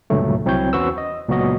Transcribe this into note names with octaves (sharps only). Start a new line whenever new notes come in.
C#2 G2 A#2 D3 F#3 A3
C2 F#3 C4 E4 C#5 G6
E2 C#4 F#4 B4 C5 E6
D#5
C#2 A#2 F#3 B3 F#4 D#5